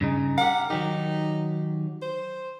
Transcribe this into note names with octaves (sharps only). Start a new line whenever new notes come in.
G2 C#3 D#4
G4 A#4 F#5
D#3 F#3 D#4 G4
C5